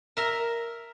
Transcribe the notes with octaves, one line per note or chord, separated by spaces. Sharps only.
A#4 E5 A#5